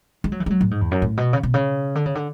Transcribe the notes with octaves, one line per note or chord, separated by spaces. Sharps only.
G#3
F#3
E3
G#3
F#3
A2
G#2
E2
F#2
A2
B2
C#3
B2
C#3
D3
C#3
D3